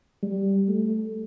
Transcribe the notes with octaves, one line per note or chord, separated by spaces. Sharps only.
G3
A3